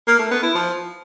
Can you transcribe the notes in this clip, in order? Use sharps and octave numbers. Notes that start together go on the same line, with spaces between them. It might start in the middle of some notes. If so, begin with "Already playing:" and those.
A#3
A3
B3
E4
F3